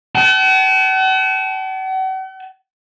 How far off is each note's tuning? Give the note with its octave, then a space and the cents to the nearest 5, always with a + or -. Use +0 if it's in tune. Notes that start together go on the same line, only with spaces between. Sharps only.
F#5 +45 A5 -35